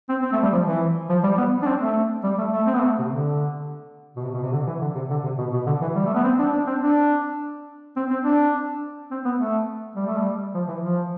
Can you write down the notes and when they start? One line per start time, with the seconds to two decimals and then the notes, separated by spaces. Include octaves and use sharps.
0.09 C4
0.22 C4
0.32 A3
0.42 G3
0.52 F3
0.65 E3
1.09 F3
1.23 G3
1.37 B3
1.62 D4
1.66 C4
1.81 A3
2.23 G3
2.38 A3
2.52 A3
2.66 C4
2.73 B3
2.80 A3
2.99 C3
3.09 D3
4.16 B2
4.23 C3
4.34 B2
4.43 C3
4.52 D3
4.66 E3
4.81 D3
4.95 C3
5.10 D3
5.23 C3
5.38 B2
5.53 B2
5.66 D3
5.81 E3
5.96 G3
6.06 A3
6.14 B3
6.24 C4
6.39 D4
6.52 D4
6.67 C4
6.81 D4
7.96 C4
8.10 C4
8.24 D4
9.11 C4
9.25 B3
9.38 A3
9.96 G3
10.07 A3
10.17 G3
10.54 F3
10.68 E3
10.82 F3